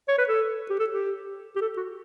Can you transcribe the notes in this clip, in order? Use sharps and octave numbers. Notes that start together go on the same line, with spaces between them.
C#5
B4
A4
G4
A4
G4
G4
A4
F#4